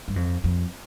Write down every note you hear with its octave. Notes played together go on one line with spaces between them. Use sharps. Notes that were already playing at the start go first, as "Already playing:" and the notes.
G2
F2
F2